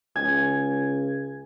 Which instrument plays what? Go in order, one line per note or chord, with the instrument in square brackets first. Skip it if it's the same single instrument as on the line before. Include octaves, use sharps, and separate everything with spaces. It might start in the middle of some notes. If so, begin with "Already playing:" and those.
[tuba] C#2 [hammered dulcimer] G#5